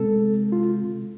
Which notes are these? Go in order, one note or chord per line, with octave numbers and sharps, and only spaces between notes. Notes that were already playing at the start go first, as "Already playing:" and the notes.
Already playing: C3 G#3 C4 A4
F4